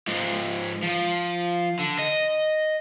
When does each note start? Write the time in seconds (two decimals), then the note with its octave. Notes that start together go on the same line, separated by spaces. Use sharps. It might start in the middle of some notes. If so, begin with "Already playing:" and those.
0.07 G#2 F3
0.83 F3
1.79 D3
1.99 D#5